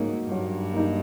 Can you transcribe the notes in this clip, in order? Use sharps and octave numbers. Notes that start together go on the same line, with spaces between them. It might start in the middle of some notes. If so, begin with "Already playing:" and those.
Already playing: G#2 F#3 A#3 D#4
G2 F#3
A#3 D#4